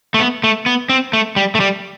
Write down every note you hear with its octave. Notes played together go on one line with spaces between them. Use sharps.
A3
B3
A3
B3
C4
A3
G3
A3
G3